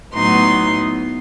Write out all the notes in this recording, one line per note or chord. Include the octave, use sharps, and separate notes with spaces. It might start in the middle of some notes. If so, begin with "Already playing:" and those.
A2 F#3 B3 D#4 C6